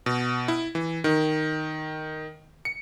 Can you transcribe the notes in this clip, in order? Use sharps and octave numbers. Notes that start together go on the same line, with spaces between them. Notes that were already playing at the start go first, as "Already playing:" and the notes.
B2
E4
E3
D#3
C#7